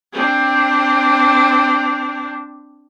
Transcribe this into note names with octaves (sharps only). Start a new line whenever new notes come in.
C4 D4